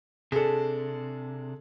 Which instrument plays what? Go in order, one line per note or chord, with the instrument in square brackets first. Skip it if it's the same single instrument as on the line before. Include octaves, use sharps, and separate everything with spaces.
[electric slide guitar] C3 D4 [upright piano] G#4 A4